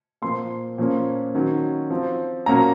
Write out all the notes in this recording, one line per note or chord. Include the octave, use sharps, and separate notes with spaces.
A#2 F3 A#3 C6
A#2 F3 A#3 C#4
D#3 F#3 C#4
F3 C4
A#2 F#3 A#3 C#4 A#5